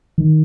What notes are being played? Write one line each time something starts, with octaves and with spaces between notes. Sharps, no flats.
D#3